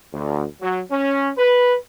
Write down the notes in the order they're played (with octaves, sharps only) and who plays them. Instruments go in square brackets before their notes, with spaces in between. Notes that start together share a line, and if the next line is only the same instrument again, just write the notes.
[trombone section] D2
F#3
C#4
B4